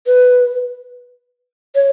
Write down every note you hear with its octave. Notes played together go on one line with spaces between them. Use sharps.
B4
C#5